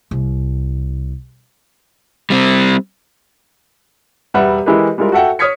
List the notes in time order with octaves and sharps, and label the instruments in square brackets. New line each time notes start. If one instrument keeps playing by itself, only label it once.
[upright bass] C2
[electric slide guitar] G3 C4
[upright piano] E1 G3 B4 E5 F#5
E3 G#3 E4 G4 A#4 B4
G3 G#3 E4 F4 A#4
F#4 A4 E5 F#5 G5
C#5 D#6 F6 G#6 B6 C#7